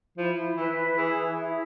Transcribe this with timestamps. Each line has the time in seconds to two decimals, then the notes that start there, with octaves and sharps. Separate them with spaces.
0.16 F3 E4
0.56 E3 B4
0.96 E3 G#4
1.36 E4